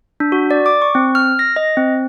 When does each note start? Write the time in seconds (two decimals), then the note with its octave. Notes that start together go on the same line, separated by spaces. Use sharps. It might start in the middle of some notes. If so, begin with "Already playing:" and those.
0.20 D4
0.32 F#4
0.51 D5
0.66 D6
0.82 C#6
0.95 C4
1.15 F6
1.39 A#6
1.56 D#5
1.77 C4